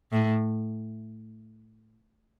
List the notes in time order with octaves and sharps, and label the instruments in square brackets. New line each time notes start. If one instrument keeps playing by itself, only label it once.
[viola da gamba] A2